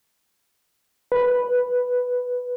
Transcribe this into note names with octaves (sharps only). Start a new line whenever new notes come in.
B4